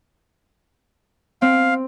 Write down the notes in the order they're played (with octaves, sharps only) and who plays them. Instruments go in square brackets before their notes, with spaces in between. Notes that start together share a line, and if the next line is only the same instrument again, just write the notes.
[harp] C4 [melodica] F5